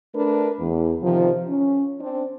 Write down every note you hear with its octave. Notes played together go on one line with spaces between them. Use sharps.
A3 D4 A#4 B4
E2
C3 D#3 F3
C#4
C4 D4